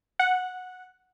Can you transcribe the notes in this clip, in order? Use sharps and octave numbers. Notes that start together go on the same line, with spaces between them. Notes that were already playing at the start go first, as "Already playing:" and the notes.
F#5